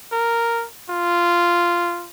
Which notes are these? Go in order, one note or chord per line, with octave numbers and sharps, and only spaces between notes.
A#4
F4